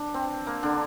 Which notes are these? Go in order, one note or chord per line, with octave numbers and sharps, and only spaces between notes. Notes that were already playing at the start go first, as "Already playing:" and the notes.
Already playing: D4
C4
A#3
D3 D4